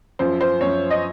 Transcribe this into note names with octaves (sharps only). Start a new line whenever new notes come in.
F#2 F3 C5
C5
F#2 F3 C#5
D#5